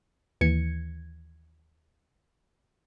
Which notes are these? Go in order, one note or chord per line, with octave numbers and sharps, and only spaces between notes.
D#2 E3 G#6 C#7